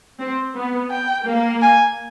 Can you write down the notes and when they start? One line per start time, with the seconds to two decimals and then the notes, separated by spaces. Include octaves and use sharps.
0.19 C4
0.56 B3
0.91 G5
1.27 A#3
1.62 G#5